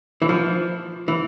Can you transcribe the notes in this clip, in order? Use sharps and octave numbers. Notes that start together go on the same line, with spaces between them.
E3
F3
E3